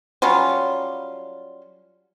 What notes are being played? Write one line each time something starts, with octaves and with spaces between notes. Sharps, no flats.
F#3 G3 C#4 F4